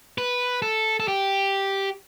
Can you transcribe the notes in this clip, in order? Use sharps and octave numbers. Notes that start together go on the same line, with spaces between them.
B4
A4
A4
G4